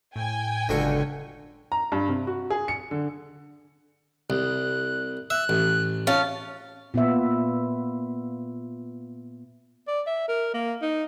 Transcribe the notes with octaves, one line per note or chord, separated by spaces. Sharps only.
A2 G5 G#5
G1 C#2 D3 F#3 A4 C#6 C#7
A#5
G2
C3
F#4
G#4
C#7
D3
C2 F#6
E5 F#6
A1
C#4 F4 A5 F6
A#2 B3 F4 E5
D5
E5
A#4
A#3
D#4